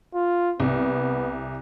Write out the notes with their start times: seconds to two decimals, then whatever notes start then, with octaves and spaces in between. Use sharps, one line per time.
0.14 F4
0.60 C2 B3